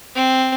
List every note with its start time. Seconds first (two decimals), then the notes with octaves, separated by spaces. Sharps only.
0.15 C4